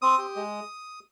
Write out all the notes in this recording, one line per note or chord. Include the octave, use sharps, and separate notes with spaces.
C4 D#6
G4
G#3